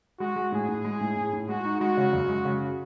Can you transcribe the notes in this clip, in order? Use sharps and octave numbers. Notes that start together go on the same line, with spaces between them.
G#3 F#4
G#3
A2 G#4
A2
G#3
A2
A2
A2
G#3 F#4
D#4
G#3 F#4
C#3
F#2
G#3
C#3